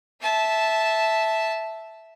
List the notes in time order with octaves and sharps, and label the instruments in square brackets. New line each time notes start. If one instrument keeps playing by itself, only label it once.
[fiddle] E5 A5